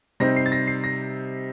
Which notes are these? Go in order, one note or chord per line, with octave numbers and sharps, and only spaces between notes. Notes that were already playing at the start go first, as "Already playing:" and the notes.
C3 G3 C4 D#4 A#6
C7
A6
A#6
C7
A#6